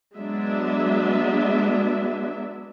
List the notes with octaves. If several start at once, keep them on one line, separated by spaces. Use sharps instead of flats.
F#3 G#3 B3 D4 E5